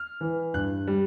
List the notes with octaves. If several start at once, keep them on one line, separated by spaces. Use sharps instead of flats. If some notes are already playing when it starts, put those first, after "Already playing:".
Already playing: F6
E3
G2 F#6
G3